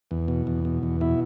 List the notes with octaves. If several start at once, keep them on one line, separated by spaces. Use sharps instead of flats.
E2
B2
E2
B2
E2
B2 E4